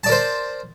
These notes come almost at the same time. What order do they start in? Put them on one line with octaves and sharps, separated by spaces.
A5 D5 A#4 C5